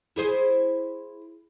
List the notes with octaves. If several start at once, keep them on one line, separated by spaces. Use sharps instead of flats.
E4 G#4 C5